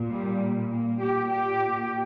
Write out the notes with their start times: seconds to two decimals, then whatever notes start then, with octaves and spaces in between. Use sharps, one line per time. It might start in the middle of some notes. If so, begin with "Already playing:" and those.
Already playing: A#2
0.10 G3
0.70 A#3
1.00 A#2 G4
1.30 G4